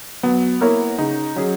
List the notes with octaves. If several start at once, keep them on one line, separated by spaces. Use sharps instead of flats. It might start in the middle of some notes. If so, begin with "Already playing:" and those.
F#3 B3
A#3 E4 A#4 C#5
C#3 D#4
F#3 C#4 G#4